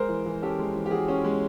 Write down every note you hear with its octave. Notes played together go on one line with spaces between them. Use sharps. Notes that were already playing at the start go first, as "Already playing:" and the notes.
Already playing: G#3 A#4 C5
E3
E3
C#4 G4 A4
G#3
E3
G4
E3 F#4 G#4
C#4
G#3